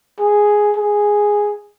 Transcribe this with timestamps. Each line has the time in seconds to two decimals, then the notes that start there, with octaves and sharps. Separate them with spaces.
0.19 G#4
0.77 G#4